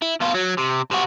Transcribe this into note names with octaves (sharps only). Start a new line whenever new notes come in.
E4
B2 F4
F#3
C3
C3 F#4